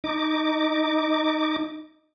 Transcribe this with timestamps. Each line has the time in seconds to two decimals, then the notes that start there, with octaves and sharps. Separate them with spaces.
0.04 D#4 D6